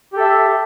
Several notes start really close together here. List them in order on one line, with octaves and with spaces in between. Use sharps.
G4 A4 E5